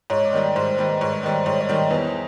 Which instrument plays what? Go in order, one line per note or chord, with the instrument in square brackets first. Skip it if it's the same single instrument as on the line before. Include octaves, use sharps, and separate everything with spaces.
[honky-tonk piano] G#2 [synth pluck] C#5
[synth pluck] D5
[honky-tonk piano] D#3 G3
[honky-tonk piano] G#2 [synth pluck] C5
[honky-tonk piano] D#3 G3 [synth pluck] B4
[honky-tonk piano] G#2 [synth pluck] C#5
[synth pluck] C#5
[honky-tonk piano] D#3 [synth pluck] C5
[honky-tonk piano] G3
[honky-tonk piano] G#2 [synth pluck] C#5
[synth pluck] C#5
[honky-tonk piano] D#3 G3
[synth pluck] C5
[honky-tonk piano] E2 [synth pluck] B4